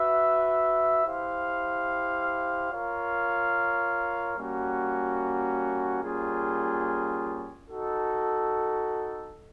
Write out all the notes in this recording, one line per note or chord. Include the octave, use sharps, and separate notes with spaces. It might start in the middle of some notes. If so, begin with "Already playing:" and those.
Already playing: F#4 B4 E5
E4 G4 C5 F5
F4 A#4 C#5 F5
G3 A#3 C#4 F#4
G3 A#3 C#4 F4 G#4
D#4 F#4 A4